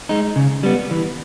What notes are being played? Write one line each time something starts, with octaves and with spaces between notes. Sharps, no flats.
G#3 D#4
C#3
G3 B3
E3